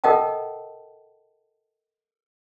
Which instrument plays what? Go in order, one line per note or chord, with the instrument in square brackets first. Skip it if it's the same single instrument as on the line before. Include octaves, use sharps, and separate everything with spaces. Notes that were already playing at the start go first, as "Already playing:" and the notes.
[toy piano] A4 A#4 D#5 F#5 G5 A5